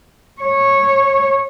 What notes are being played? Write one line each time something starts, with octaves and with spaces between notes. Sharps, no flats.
C#5